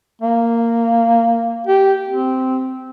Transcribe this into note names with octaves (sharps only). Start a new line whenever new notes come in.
A#3
G4
C4